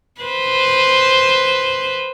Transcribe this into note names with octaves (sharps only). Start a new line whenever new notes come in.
B4 C5